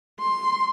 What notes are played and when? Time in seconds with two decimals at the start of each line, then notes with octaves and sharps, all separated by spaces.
0.20 C6